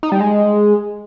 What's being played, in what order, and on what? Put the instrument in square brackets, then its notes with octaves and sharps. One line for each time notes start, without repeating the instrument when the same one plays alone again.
[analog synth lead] D#4
G3
G#3